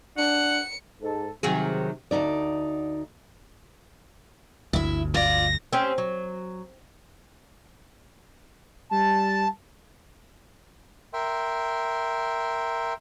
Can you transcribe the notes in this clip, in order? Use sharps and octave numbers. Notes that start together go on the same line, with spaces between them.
D4 F#5 C#7
G#2 A4
C3 D#3 F#3 G#4
D2 B2 D#4 D5
G1 D2 E4 E5
F4 D5 A#6
C4 C#4 G4
F#3
G3 A5
A#4 E5 G5 C6